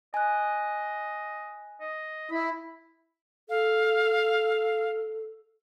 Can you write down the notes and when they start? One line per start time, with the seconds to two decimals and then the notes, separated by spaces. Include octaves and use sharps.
0.14 D#5 G#5 F#6
1.80 D#5
2.31 E4 B5
3.49 A4 F5